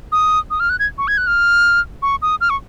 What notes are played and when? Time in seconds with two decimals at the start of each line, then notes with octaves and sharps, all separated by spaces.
0.12 D#6
0.51 D#6
0.60 F6
0.70 F#6
0.79 G#6
0.98 C#6
1.08 G#6
1.18 F#6
1.27 F6
2.02 C#6
2.22 D#6
2.41 F6
2.50 C#6